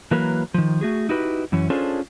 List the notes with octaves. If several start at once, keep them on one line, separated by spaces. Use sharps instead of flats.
E3 F#3 A#3 A#4 B4
D#3 F3
A3 F#4 G#4
D#4 E4 F#4 G4 B4
F#2 E3 C#4
C#4 D4 F4 G#4 A4 C5